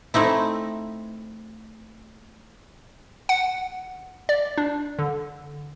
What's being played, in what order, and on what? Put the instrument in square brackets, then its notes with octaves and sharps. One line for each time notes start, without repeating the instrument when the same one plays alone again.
[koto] A3 C4 D#4 E4
[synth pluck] F#5
D5
D4
D3